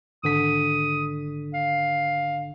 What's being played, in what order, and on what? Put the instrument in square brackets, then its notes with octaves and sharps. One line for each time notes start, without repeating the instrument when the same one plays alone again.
[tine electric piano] G#1 D3 B6 [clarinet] D#6
[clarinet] F5